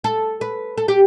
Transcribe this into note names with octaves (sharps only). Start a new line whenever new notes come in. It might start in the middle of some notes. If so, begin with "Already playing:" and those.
A4
B4
A4
G4